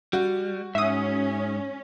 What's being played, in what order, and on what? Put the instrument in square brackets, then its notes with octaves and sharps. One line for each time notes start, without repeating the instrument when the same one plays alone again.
[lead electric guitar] G3 [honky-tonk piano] F#4
[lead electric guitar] G#2 [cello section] C#4 [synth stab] E5 D#6